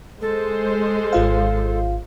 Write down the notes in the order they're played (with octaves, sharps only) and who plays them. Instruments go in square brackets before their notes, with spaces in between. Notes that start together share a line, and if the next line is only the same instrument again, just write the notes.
[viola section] G#3 C5 [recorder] A4
[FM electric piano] G#1 F4 F5